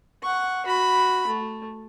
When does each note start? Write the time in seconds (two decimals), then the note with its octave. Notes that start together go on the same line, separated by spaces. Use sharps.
0.22 F#5 C#6
0.66 F#4 B5
1.27 A3